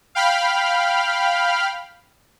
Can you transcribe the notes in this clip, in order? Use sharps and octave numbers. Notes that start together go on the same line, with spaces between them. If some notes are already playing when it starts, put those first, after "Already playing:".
F5 G5 B5 F6